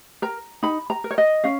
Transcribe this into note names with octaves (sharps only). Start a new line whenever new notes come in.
A#4 A#5
D#4 B5
A#5
A#4
C#5
D#5
C#4 F5